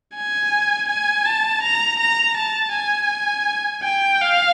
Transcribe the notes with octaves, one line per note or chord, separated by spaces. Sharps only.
G#5
G#5
A5
A#5
A#5
A5
G#5
G5
F5